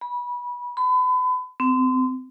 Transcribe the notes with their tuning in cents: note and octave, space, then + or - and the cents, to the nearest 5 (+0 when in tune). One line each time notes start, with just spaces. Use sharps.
B5 -25
B5 +35
C4 -30